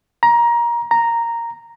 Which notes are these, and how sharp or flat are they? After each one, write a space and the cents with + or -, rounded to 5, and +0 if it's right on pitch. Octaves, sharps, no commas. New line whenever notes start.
A#5 +20
A#5 -5